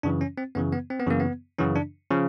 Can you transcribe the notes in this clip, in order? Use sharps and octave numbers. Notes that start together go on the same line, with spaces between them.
F#2 C#3 E3 D4
C#4
C4
F#2 C#3 E3 B3
B3
C4
B3
F#2 C#3 E3 A#3
B3
F#2 C#3 E3 C#4
D4
C#3 F3